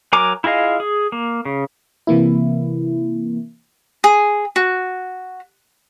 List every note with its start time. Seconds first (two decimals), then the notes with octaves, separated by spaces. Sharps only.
0.13 F#3 A#4 G#5 A#5 D6
0.44 E4 F4 G#4 D#5 F5
0.80 G#4
1.12 A#3
1.45 C#3
2.07 C3 E3 A#3 E4
4.04 G#4
4.56 F#4